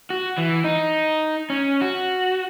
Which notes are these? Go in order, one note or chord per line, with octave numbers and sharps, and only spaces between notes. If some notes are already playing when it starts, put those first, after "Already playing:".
F#4
E3
D#4
C#4
F#4